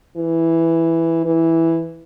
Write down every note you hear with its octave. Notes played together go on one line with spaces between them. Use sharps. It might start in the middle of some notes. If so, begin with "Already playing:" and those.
E3
E3